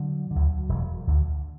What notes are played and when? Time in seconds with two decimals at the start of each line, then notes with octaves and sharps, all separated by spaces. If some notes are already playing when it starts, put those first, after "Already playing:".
Already playing: D3 F#3
0.31 D2 D3
0.69 E1
1.07 D2 D3